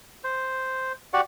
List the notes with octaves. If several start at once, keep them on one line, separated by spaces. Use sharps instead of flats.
C5
F#4 G4 D5 F#5